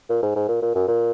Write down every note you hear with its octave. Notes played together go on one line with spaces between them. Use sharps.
A#2
G#2
G#2
A#2
A#2
F#2
A#2